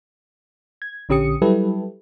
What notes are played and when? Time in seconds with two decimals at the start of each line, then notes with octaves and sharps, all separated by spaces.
0.82 G#6
1.09 A#1 D3 C#4 G4 D#6 C#7
1.42 F#3 G3 E4 G4 A4 B4